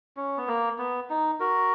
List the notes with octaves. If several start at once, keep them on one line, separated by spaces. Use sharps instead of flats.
C#4
B3
A#3
B3
D#4
F#4 A#4